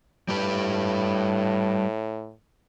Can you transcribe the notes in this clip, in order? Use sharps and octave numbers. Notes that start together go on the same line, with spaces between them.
A2 G3 G4 B4